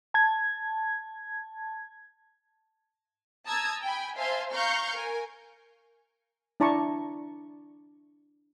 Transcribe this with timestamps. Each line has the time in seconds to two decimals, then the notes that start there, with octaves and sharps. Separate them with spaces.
0.14 A5 G#6
3.46 A5 A#5 D#6 E6 G#6
3.82 G5 G#5 B5
4.16 C5 E5 F5 G#5 A5 C6
4.51 F5 A#5 C#6 F6 G6
4.93 A#4 G#5
6.60 D4 E4 D5 A5 A#5 C#6